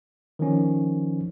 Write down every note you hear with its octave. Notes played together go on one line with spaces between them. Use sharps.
D#3 F3 C#4